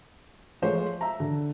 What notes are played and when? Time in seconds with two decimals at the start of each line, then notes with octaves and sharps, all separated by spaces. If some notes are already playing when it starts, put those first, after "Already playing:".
0.62 F3 G#3 A3 C5 C#5
1.01 E5 A#5
1.20 D3